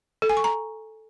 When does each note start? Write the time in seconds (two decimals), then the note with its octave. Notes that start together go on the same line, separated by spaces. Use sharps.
0.22 A4
0.29 G#5
0.37 C#6
0.44 A#5